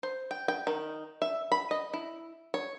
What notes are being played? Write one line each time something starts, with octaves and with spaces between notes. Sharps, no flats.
C5
G5
G5
D#3
E5
B5
D#5
E4
C#5